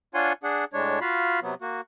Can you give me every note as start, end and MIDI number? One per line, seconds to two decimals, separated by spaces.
0.14 0.33 62
0.14 0.33 65
0.14 0.33 73
0.14 0.33 78
0.14 0.33 80
0.14 0.33 84
0.43 0.65 62
0.43 0.65 68
0.43 0.65 78
0.73 0.99 45
0.73 0.99 56
0.73 0.99 62
0.73 0.99 73
1.01 1.40 65
1.01 1.40 66
1.01 1.40 77
1.01 1.40 83
1.42 1.54 48
1.42 1.54 54
1.42 1.54 59
1.62 1.81 58
1.62 1.81 66